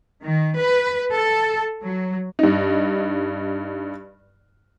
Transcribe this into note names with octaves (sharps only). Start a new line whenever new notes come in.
D#3
B4
A4
F#3
G2 D#4